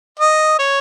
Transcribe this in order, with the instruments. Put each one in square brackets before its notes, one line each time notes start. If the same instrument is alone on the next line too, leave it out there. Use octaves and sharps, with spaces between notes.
[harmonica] D#5
C#5